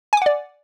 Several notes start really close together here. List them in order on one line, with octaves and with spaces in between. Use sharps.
G#5 D6 F#5 D5